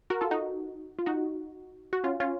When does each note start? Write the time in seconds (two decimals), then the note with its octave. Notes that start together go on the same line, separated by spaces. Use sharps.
0.10 F#4 A#4
0.21 F4 A4
0.31 D#4 F#4
0.99 F4
1.06 D#4 F#4
1.93 F#4
2.04 C#4 F4
2.20 C#4 F4